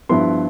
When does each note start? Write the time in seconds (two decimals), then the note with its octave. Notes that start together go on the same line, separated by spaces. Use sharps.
0.09 G2 F3 B3 E4 C6